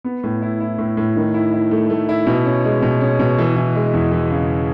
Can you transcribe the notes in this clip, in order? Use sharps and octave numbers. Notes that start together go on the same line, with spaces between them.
B3
A2
E4
E4
A2
A2
D#3
E4
E4
A3
A3
E4
B2
C#4
G#3
B2
C#4
B2
E3
E3
G#3
E2
E3
C#3